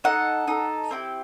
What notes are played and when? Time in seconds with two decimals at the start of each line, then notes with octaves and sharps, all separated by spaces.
0.04 D#4 A4 F#5
0.48 D#4 A4
0.91 C4 E4 G4